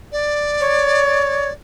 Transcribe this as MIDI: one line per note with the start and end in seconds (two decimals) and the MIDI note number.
0.12 1.53 74
0.60 1.48 73